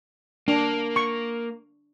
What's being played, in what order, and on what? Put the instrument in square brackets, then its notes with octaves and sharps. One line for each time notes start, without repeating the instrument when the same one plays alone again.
[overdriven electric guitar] A#3 [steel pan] D4
[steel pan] C#6